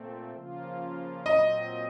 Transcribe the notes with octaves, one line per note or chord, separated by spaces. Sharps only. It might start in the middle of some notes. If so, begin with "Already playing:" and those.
Already playing: A#2 A3 C4
C#3 F3 A#3 F4
A#2 F#3 C4 D#5